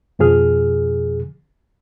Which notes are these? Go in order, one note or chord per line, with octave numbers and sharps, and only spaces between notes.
F2 B2 F3 G#4 F6